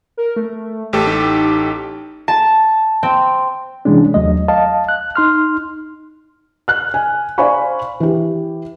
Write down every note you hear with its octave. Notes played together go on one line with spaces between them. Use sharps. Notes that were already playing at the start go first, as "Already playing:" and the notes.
A#4
A3
A1 A3 G4 A4
D#4
A5
C4
C3 E3 G#3 C#4 D4
D#2 F#3 A3 D#5
D#5 F5 A5
F#6
D#4 C6 F6
F6 F#6
G#5
C5 D5 F5 G#5 B5 C#6
E3 G4